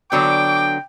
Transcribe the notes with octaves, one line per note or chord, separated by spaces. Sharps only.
D3 F#3 B3 G5 D6